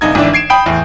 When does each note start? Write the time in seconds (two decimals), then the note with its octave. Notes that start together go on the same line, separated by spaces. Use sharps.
0.01 G1 C2 D#4 G#6
0.15 G#1 D3 E3 D4 E5
0.34 G#6 C7 D7 E7
0.50 G5 B5 D#6 G6 D7
0.66 E2 A2